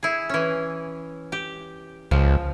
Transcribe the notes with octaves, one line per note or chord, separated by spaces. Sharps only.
E4 G#4
E3 C#4
G4
C#2 F3